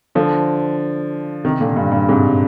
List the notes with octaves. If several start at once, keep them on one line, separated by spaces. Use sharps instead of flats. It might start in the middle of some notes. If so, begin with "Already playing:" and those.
D3 F3
C3 D#3
A#2 D3
G2 A#2
G2 A#2
G#2 C3